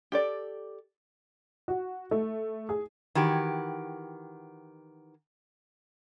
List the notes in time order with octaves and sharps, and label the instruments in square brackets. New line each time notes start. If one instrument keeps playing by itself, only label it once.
[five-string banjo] G4 A4 D5
[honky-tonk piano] F#4
A3
G#4
[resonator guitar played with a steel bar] D#3 E3 F#4 G4